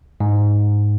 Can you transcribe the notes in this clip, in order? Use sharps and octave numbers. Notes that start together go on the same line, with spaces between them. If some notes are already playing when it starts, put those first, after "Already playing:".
G#2